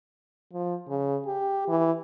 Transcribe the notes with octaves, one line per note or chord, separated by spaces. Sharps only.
F3
C#3
G4
E3